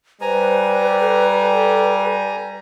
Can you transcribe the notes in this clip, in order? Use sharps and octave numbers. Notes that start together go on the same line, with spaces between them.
G3 B4 C5 G#5 A#5
A4